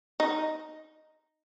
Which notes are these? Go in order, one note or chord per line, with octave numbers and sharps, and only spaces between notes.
D#4